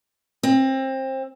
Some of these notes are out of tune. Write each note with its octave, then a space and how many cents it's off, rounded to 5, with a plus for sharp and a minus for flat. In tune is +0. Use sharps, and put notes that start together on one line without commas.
C4 +25